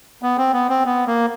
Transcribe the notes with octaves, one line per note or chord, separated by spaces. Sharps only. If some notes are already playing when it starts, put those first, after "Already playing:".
B3
C4
B3
C4
B3
A#3